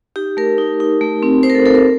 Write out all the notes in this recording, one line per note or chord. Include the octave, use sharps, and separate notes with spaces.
D#4 G4
A3 A#4
D#4
D#4
A3
C4
D#4 C5
A#4
A4
A3 A4
A#4